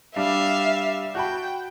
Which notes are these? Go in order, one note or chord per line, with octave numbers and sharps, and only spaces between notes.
G3 D4 E5 F5
F#4 G5 A5 B5